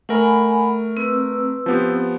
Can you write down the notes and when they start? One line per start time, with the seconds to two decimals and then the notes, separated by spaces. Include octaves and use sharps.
0.09 A3 A#4 F#5 G#5 B5
0.97 C4 B4 E6
1.66 F3 B3 G4